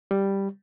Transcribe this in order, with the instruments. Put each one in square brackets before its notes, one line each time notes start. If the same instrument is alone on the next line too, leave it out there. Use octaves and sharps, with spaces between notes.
[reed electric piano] G3